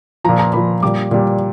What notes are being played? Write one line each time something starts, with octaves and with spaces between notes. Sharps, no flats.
A#2 F3 A#5
A#5
A#2 F3 B5
A#2 G3 D6
A#2 G3